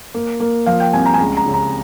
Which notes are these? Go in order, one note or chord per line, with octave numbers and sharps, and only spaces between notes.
A#3
A#3
F3 F5
G5
C2 G#5
A#5
G#5
C#2 A#5
A#5
C#3
A#5